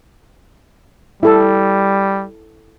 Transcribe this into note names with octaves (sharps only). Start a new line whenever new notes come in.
G3 E4 A4 A5